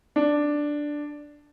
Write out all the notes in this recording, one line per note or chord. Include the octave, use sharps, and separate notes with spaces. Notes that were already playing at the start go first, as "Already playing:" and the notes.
D4